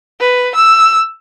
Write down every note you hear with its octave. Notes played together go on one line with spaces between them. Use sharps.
B4
E6